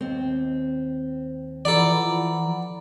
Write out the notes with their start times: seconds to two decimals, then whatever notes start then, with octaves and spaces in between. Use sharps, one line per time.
0.01 D#2 C4
1.65 E3 F3 A4 D5 F#5 A#5 B5